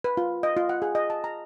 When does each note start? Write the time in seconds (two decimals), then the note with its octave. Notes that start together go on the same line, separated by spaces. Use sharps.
0.04 B4
0.17 F4
0.43 D#5
0.57 F4
0.69 F#5
0.82 G#4
0.95 D#5
1.10 A5
1.24 A#5